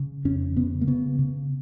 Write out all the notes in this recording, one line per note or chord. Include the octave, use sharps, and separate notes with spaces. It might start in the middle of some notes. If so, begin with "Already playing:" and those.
Already playing: C#3
F2 C#4
C#3 B3
A#3
C#3 B3
C#3